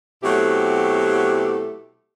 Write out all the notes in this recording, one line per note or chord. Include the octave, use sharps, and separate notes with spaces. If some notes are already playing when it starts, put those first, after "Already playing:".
B2 F#3 A3 C4 E4 G4